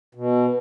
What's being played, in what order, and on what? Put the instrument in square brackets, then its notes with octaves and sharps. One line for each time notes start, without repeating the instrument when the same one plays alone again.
[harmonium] B2